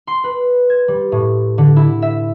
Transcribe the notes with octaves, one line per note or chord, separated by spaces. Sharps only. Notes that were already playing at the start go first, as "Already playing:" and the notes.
C6
B4
G#6
G3
A2
D3
E4
E5